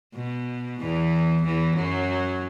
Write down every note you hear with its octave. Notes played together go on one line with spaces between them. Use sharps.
B2
E2 E3
E2 E3
F#2 F#3